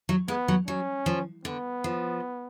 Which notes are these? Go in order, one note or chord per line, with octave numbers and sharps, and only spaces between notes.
F#3
G#3 B3
F#3
F#3 C#4
F3
D3 B3
F3